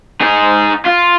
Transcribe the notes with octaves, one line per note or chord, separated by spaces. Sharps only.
D#4 G#4
F4